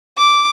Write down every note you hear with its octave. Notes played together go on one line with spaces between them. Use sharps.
D6